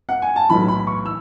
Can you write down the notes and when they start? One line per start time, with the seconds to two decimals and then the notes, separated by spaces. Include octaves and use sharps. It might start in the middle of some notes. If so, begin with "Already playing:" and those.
0.09 F#5
0.22 G#5
0.36 A5
0.49 B1 A2 E3 B5
0.68 B5
0.87 C#6
1.06 E6